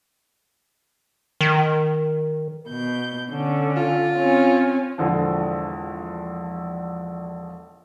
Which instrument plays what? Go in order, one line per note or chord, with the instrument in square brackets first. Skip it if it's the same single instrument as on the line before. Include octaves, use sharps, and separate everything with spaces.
[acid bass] D#3
[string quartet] B2 G6
D3 C#4
[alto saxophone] F4
[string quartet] C4 C#4 G#5
[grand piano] E1 A#1 D3 F3